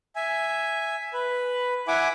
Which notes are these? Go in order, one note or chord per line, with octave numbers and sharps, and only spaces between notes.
E5 G#5
B4
E4 E5 F#5 G#5 D6